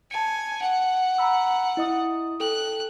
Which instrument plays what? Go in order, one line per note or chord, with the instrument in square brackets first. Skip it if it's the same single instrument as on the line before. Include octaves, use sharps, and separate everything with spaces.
[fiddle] G#5 [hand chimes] A5 C#7
[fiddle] F#5
[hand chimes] A#5 B5 E6
E4 D#5 D#6
[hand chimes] A4 G5 [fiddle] F#6